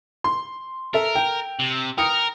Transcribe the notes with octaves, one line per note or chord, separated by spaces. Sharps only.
C6
A4 A#4 E5
G5
C3
A#4 G5 D#6 C#7